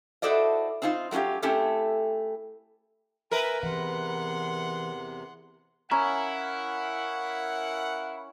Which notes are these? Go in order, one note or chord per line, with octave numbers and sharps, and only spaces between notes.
E4 F#4 A4 C5 D5 D#5
C4 D4 D#4 F4 C5
F#3 A3 C#4 F4 G4
A3 C4 C#4 E4 G4 A4
A#4 B4 E5 G#5 A#5
E2 C3 E3 F#5 C6
C#4 E4 A#4 F5 F#5 A#5